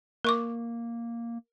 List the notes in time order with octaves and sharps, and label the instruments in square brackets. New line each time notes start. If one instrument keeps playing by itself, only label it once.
[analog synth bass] A#3 [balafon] A#4 C#6 D6